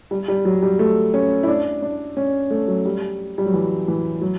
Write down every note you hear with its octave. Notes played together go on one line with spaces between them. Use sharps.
G3
G3
F#3
G3
A3
C#4
E4
D4
D4
C#4
A3
F#3
G3
G3
F#3
E3
E3
F#3